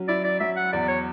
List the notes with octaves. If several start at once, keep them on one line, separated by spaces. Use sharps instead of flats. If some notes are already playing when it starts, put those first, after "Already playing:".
Already playing: F#3 C#4
E4 D5
D5
F#3 E5
F#5
E2 D5
C#5